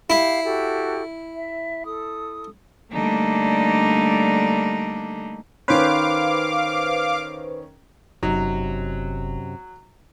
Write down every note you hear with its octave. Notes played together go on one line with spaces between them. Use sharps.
E4 G4 F5
F#4 G4 A4
E5
A4 D#6
D3 G3 A3 A#3 D4 D#4
D#3 C#4 B4 C5 F5 D6
F1 F#2 C3 F#3 D#4